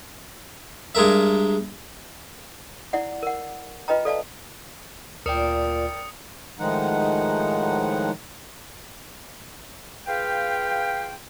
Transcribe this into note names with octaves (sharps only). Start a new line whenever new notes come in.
G2 G#3 A#4 E5
E4 D5 F#5
A#4 F#5
F4 B4 D#5 G5 A#5
A4 D5 F5 A5
D2 A#2 A#4 D5 G5 D#6 C#7
A2 D#3 F3 G#3 D#4 F#5
F4 G#4 B4 F5 G5